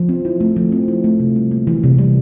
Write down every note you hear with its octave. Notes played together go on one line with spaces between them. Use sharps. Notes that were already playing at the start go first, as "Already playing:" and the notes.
Already playing: F3
C4
E4
A3
F3
C4
E4
A3
C3
G3
A#3
E3
C3
G3